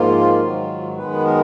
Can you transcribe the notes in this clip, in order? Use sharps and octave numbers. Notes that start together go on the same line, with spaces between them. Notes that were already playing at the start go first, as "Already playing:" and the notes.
Already playing: G#2 F3 A#3 F4
G#2 D#3 F#3
F#2 D#3 G#3 B3 B4
A#4